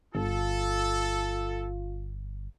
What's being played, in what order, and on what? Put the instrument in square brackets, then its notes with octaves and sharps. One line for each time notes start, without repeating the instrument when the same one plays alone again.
[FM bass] G1 [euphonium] F4 [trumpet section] A4